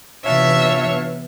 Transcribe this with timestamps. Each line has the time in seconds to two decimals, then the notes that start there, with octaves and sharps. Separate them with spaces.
0.25 C3 E3 B3 D4 F4 C#5 E5